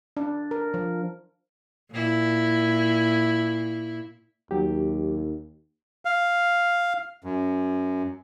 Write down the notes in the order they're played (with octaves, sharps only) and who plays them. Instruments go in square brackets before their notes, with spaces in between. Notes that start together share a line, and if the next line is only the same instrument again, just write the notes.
[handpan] D4
A#4
F3
[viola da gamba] A#2 E4
[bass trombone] D#2 [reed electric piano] F#3 G4
[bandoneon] F5
F#2